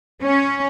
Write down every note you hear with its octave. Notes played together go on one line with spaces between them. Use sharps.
C#4